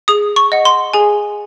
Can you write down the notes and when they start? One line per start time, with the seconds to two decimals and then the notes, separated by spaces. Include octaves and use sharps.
0.08 G#4 D#6
0.36 C#6
0.52 D#5 F#5
0.65 C6
0.94 G#4 G#5